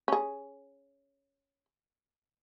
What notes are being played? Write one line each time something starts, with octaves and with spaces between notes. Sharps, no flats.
C#4 G#4